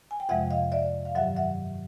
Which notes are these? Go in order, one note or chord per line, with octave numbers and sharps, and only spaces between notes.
G#5
G5
F2 C3 F3 G#3 E5 F#5
D#5 F5
D5 E5
F5
G2 D#3 F#3 E5 F#5
E5 F#5